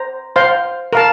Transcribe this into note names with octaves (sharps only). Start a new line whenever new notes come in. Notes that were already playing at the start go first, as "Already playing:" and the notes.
Already playing: C5 A#5
C5 F5 C6
A#4 F5 A5